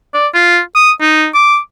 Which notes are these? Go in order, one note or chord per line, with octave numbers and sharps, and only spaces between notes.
D5
F4
D#6
D#4
D6